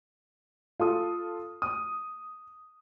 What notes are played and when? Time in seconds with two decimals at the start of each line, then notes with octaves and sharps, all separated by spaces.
0.80 F4 A4 D#6
1.62 D#6